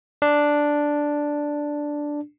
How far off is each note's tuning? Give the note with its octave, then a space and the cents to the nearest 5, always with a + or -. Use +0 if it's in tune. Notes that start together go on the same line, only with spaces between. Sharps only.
D4 +0